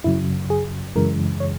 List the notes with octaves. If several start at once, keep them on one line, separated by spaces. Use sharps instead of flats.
F#2 C#3 F#3 E4
G#4
F#2 C#3 E3 G#3 A#4
C#5